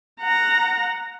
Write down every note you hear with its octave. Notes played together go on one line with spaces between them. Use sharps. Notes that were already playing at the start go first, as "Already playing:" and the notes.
F#5 A#5